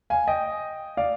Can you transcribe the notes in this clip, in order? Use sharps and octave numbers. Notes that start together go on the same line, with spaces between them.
F5 G#5
D#5 G5
D5 F5